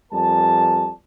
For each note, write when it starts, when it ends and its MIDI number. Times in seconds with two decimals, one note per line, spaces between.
0.13 0.90 41
0.13 0.90 55
0.13 0.90 70
0.13 0.90 74
0.13 0.90 80
0.13 0.90 81